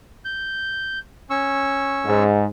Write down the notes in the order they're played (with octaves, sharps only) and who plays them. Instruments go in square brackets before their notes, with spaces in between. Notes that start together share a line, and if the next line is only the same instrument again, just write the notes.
[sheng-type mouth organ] G6
C#4 C#6 E6
[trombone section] G#2